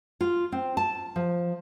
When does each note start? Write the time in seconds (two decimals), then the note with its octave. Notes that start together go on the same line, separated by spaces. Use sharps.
0.21 F4
0.52 C4
0.77 A5
1.16 F3